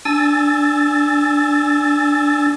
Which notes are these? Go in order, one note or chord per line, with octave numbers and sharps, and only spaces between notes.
D4 G#5 E6 A6